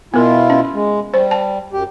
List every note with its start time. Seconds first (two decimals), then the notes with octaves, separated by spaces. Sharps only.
0.14 B2 B3 E4 F4 A#4
0.50 C#4
0.74 G#3
1.14 G3 C5
1.31 A5
1.73 F#2 G4